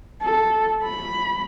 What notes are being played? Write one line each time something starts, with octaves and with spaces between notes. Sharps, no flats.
A4
B5